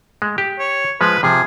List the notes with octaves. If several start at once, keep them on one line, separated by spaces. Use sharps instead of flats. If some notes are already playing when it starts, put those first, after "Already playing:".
G#3
G4
C#5
F3 G#3 B4
C3 F3 G#4